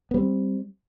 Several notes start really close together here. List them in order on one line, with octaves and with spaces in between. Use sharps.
B3 G3 C4